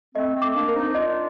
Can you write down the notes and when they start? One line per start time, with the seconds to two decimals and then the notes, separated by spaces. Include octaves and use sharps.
0.15 A3 C4 D#5
0.35 A3 C4
0.42 D6
0.55 A#3 D4
0.68 A#4
0.75 C4 D#4
0.95 D4 F4 D#5